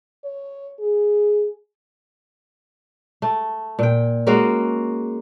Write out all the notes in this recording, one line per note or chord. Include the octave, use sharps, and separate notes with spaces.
C#5
G#4
A3
A#2 G5
G#3 A#3 C#4 F#4